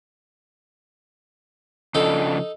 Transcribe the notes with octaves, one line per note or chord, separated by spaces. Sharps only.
C#3 F3 D4 D#4 A4